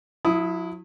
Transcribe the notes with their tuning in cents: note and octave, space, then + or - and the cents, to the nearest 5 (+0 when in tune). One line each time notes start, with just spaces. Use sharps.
F#3 -45 E4 +0 D#6 +5